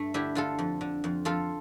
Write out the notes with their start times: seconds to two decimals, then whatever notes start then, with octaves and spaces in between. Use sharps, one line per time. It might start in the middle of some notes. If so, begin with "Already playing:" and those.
Already playing: G2 A3 D4
0.14 D3 E4 G4
0.35 D3 F4 A4
0.59 F2
0.81 D3
1.04 F2
1.25 F2 F4 A4